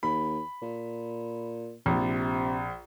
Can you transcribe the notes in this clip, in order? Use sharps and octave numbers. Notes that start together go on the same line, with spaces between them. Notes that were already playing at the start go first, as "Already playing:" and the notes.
D#2 B5
A#2
A#1 C3